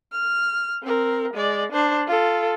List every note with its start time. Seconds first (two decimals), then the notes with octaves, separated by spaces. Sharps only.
0.12 F6
0.83 C4 A#4
1.34 G#3 D5
1.72 D4 C5
2.07 F4 A4